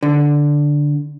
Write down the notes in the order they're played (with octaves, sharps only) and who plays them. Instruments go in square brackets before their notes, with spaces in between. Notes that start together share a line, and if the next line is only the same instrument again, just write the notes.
[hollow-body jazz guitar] D3